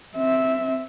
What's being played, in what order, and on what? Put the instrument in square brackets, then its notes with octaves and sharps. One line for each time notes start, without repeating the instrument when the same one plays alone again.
[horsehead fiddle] C4 E5